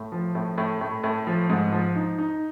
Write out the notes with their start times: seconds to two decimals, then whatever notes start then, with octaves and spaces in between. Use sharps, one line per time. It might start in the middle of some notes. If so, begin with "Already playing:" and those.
Already playing: A2
0.12 F3
0.35 A2
0.58 A2
0.81 A2
1.04 A2
1.27 F3
1.50 G#2
1.72 F3
1.96 D#4
2.18 D#4